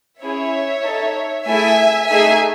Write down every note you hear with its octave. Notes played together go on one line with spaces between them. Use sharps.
C#4 E4 G#4 C#5 E5
D#4 A4
A3 E4 G#4 E5 G#5
A3 D#4 G#4 E5 G#5